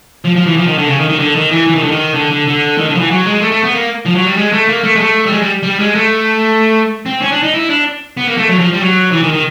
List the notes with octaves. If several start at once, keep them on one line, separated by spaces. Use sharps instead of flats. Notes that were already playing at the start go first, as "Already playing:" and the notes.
F3
F3
E3
F3
D#3
D3
C#3
D#3
D#3
D3
D#3
E3
E3
D#3
D3
D#3
D3
D3
D3
D#3
D3
F3
E3
F#3
G#3
A3
A3
B3
A#3
F3
F#3
G3
G#3
A3
A#3
A3
G#3
A3
G3
G#3
G3
G3
G#3
A3
C4
C#4
D4
D#4
E4
D4
B3
A#3
A3
F#3
F3
G3
F#3
E3
D#3
D#3